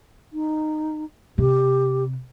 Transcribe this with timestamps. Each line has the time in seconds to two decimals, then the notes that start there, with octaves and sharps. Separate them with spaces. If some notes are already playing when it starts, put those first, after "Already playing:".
0.33 D#4
1.38 C3 G4